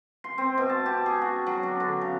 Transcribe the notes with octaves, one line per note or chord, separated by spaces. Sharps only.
C6
C4
B2
A5
G4
G#4
F#4
F#3
D4
D3
C#3